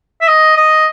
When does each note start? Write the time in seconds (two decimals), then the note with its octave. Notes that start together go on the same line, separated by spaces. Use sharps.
0.21 E5
0.28 D#5
0.57 D#5